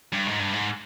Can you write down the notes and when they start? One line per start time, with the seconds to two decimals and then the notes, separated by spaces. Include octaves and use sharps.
0.13 G2
0.26 G#2
0.39 G2
0.53 G#2